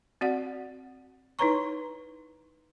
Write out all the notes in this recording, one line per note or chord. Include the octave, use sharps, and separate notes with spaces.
C4 F#4 D5 F#5
D#4 E4 B4 C#5 A#5 C#6